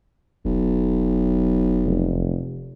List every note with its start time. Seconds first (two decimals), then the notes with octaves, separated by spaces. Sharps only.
0.45 E1 B1
1.85 F1